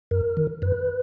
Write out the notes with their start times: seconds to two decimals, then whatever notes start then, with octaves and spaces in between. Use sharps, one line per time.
0.11 F#2 A#4
0.37 D#3
0.62 F#2 B4